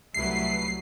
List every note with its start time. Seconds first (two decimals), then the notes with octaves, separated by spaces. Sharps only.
0.14 C2 F#3 A3 E4 B4 C7